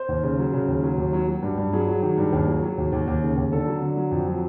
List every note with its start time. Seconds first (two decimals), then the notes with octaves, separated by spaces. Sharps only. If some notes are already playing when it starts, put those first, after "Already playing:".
Already playing: C5
0.08 D#2
0.23 C#3
0.38 F#3
0.53 C#3
0.68 D#2
0.83 F#3
0.98 D#2
1.13 F#3
1.28 F#3
1.43 G2
1.58 G2
1.73 F#3 G#4
1.88 F#3
2.03 D#3
2.18 G2
2.32 D#2
2.47 F#3
2.62 F#3
2.78 D#2
2.92 D#2
3.07 D#2
3.22 C#3
3.37 D#2
3.52 D3 A4
3.67 F#3
3.82 D3
3.97 F#3
4.11 F2
4.27 F#3